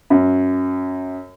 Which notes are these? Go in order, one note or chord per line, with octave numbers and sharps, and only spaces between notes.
F#2